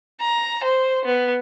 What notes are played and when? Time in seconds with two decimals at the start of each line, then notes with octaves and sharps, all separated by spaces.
0.21 A#5
0.64 C5
1.05 B3